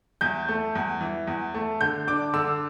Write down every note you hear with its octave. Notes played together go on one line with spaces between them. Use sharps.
E2 G6
A3
E2
E3
E2
A3
D3 G6
D4 D6
D3 E6